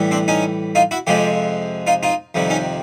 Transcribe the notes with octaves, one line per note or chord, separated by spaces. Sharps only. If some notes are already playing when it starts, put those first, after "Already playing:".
Already playing: A2 E3 G3
C4 D4
C#4 D#4
D#4 F4
E4 F#4
F2 C3 F3 G#3 F4 G4
D#4 F4
D#4 F4
F2 C3 D#3 G3
C#4 D#4